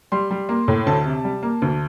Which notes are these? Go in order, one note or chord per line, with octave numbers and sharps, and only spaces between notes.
G3 C6
G3
A#3
A2
D2 A5
C3
G3
A#3
D2